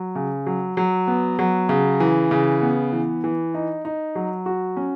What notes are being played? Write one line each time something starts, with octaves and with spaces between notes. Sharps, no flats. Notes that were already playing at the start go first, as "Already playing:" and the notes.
Already playing: F#3
C#3
F#3
F#3
B3
F#3
C#3
E3
C#3
B3
E3
E3
D#4
D#4
F#3
F#4
C#4